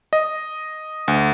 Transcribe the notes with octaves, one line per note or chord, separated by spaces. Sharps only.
D#5
D2